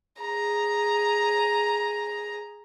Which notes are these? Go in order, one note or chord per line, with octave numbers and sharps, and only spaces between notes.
G#4 A#5